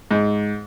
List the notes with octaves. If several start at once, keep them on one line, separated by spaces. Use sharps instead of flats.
G#2